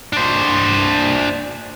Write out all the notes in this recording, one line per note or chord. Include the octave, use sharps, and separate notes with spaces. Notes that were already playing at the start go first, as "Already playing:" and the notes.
D4 C5